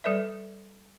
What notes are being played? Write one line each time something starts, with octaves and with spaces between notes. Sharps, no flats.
G3 A4 B4 D5 E5